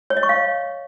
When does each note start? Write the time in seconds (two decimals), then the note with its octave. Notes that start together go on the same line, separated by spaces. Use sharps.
0.10 C#5
0.17 D#5
0.23 C#6
0.29 F5
0.36 C#5